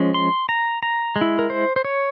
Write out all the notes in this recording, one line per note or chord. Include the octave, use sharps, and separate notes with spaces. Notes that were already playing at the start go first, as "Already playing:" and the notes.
Already playing: F3 G#3 C#4
C6
A#5
A#5
G#3
E4
A#4
C5
C5
C#5